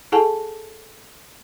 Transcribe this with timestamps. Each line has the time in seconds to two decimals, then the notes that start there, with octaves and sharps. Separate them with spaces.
0.12 E4 G#4 A4 F#5 G#5 A5